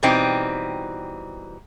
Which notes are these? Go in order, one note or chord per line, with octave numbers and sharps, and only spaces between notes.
B2 E3 G3 C4 D#4